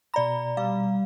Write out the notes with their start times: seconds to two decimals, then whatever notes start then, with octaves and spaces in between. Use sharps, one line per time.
0.14 B2 D5 A#5 B5
0.57 G3 F5